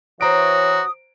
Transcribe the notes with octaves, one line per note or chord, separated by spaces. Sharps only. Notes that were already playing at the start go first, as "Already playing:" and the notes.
E3 F#4 C5 C#5 A#5 D#6 D7